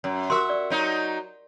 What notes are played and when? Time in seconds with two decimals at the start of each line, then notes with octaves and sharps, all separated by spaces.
0.04 F#2
0.30 F#4 G4 A#4 E5 C6
0.50 D5
0.70 F#3 D#4